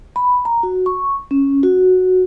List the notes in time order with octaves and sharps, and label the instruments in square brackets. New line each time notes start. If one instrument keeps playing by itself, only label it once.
[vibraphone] B5
A#5
F#4
C#6
C#4
F#4